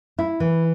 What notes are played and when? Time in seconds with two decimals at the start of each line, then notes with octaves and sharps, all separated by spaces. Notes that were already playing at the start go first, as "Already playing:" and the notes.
0.19 E4
0.40 E3